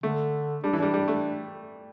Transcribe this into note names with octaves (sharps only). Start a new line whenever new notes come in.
D3 A3
G3 D4
E3
G3 D4
G3
A3